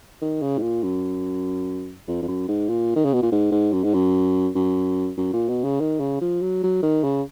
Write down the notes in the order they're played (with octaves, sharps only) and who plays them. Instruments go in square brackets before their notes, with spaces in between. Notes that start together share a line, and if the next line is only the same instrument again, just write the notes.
[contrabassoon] D#3
C#3
G#2
A#2
F#2
F2
F2
F#2
G#2
A#2
D#3
C#3
B2
A#2
G#2
G#2
F#2
G#2
F#2
F#2
F#2
A#2
B2
C#3
D#3
C#3
F3
F#3
F#3
D#3
C#3